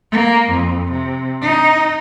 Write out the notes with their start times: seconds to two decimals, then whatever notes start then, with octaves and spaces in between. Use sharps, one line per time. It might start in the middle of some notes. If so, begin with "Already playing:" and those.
0.12 A#3
0.50 F2
0.92 C3
1.42 D#4